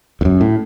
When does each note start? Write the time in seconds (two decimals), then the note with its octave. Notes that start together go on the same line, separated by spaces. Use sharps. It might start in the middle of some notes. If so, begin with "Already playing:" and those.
0.21 E2
0.25 F#2
0.41 A2